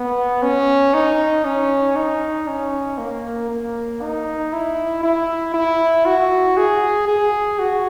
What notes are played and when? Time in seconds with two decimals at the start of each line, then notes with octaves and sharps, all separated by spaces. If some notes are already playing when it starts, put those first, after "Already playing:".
Already playing: B3
0.42 C#4
0.94 D#4
1.45 C#4
1.96 D#4
2.48 C#4
2.98 A#3
3.50 A#3
4.01 D#4
4.53 E4
5.03 E4
5.54 E4
6.06 F#4
6.57 G#4
7.08 G#4
7.59 F#4